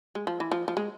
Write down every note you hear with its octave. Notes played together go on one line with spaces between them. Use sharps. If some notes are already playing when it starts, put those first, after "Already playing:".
G#3
F3
E3
F3
F3
G#3